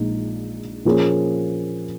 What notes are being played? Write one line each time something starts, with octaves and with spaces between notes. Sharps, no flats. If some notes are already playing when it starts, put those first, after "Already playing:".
Already playing: A#1 A#2 G#3 D#4
A#2 F3 A#3 C#4 G#4